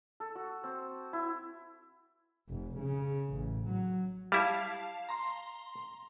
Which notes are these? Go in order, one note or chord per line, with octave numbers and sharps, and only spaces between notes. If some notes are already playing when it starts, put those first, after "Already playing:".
A4
F#4
C4
E4
F1
C#3
A1
F#3
G3 E4 F5 A5
A#5 C6